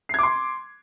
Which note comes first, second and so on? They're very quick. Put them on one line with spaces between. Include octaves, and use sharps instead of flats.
C7 G#6 D6 C6